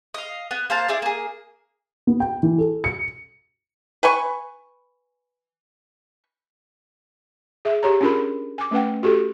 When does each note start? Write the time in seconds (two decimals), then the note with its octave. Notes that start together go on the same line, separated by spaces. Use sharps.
0.14 D#5 F5
0.51 B3
0.70 A#3 C5 F5 A5
0.88 E4 G#4 D5
1.02 A#3 G#4
2.07 B3
2.20 G5
2.43 E3
2.58 A4
2.84 C#7
4.03 B4 G#5 C#6
7.65 G#4 E5
7.83 G4 C#5 A#5
8.01 C#4 D4 F4 G#4 A#4 B5
8.58 G#5 D6
8.71 A3 C#4 B4 F#5 G5
9.03 F#4 G4 A4